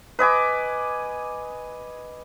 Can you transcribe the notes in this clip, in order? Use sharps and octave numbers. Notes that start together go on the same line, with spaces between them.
B4 D#5 G#5 D6